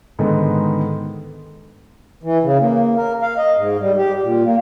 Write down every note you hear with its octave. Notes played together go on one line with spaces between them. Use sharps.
G#2 D3 D#3 G#3 B3 D#4
E3
C#3
A#3
A#4
F5
D#5
G#2
G3
G4
A#2
A#3